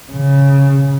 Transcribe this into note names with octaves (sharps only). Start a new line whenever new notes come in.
C#3